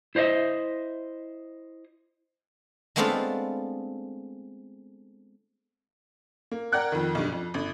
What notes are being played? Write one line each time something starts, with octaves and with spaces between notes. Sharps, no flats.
E4 C5 C#5 D#5 E5
G#3 A3 B3 C4 D4 F4
A#3
A#4 D5 F#5 G5 F#6 G#6
F2 D#3
B1 G2
F2
G1